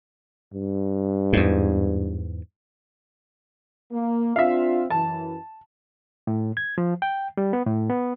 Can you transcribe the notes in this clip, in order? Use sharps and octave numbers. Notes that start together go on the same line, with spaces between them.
G2
E2 G#2
A#3
C4 D4 F4 E5 F5
F#2 E3 A5
A2
G#6
F3
G5
G3
B3
A2
B3